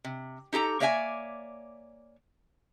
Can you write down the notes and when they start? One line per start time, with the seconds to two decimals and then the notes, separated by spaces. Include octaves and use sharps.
0.04 C3
0.53 D#4 G4 A4 A#5
0.80 A#3 C#5 D5 E5 F#5 G#5